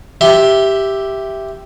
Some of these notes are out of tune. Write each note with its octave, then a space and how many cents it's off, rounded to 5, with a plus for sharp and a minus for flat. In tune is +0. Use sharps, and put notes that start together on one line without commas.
G4 +0 E5 +0 C6 +10